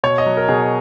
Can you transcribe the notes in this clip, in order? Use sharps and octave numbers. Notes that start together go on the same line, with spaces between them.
B2 C#5
D#5
F#3
A#4
B2 G#4